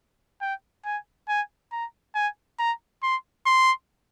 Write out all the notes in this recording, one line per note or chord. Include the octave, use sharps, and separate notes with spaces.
G5
G#5
G#5
A#5
G#5
A#5
C6
C6